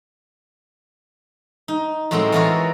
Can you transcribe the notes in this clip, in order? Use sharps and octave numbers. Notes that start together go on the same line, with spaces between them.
D#4
A2 F#3 G#3 C4 A#4 G5
E3 F4 F#4 G#4 A#4 C#5